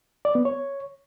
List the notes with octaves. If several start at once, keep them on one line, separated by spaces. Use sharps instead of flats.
D5
B3
C#5